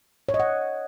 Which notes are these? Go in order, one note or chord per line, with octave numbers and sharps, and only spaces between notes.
C#5
D#5
F#5